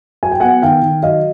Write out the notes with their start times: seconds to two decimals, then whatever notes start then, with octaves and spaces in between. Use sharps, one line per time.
0.23 F#3 G#5
0.32 G5
0.40 B3 F#5 G#5
0.62 D#3 F5 G5
0.82 D#3
1.03 F#3 D#5 F5